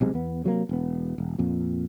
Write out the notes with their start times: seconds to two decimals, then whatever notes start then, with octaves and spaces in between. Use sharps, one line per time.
0.01 B1 C3 G#3
0.14 E2 B3
0.44 C3 F#3 A3 A#3
0.69 E1 B3
1.18 E1
1.38 F2 A#2